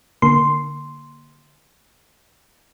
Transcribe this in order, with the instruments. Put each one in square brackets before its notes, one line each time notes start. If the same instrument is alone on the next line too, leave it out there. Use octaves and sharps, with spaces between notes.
[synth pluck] D3 A#3 C6